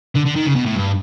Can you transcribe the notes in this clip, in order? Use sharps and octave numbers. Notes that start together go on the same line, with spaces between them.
D3
D3
D#3
C#3
B2
A2
G2